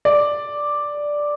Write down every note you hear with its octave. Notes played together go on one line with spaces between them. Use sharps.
D5